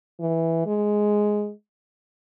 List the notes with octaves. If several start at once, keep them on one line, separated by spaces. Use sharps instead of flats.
E3
G#3